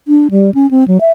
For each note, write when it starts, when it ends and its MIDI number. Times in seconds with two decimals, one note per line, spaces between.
0.08 0.28 62
0.31 0.50 55
0.54 0.69 61
0.71 0.84 60
0.88 1.00 54
1.01 1.11 76